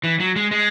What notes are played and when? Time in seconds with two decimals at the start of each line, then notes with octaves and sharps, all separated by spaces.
0.04 E3
0.20 F#3
0.36 G#3
0.51 G#3